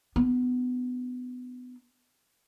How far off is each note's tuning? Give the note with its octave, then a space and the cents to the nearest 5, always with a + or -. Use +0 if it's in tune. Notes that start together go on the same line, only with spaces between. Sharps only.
B3 +20 D4 +0